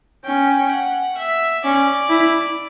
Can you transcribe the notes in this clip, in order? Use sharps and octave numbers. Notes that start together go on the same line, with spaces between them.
C#4 G5
F#5
E5
C#4 D5
E4